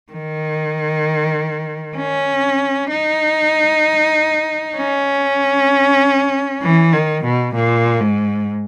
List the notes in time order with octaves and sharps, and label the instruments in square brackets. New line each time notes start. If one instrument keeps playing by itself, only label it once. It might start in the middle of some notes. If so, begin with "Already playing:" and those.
[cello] D#3
C#4
D#4
C#4
E3
D#3
B2
A#2
G#2